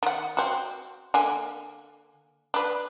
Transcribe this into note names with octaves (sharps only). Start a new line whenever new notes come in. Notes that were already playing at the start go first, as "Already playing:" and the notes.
D#3 F#5
C4 F#4
D3 A#3 G#5
D4 B4